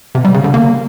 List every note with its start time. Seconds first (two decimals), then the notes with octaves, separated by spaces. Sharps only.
0.15 C3
0.25 G3
0.34 C#3
0.44 D3
0.54 A#3